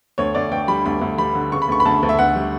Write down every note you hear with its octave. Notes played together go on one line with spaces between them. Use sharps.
D2 C#5
D2 D5
D2 G5
G3 B5
D2 B5
D2
G3 B5
D3
C#3 C#6
B5
D2 C#6
B5
D2 A5
D2
E5
D2 F#5
G3